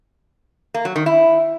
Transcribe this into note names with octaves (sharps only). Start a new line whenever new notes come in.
A#3
F#3
D#3
E4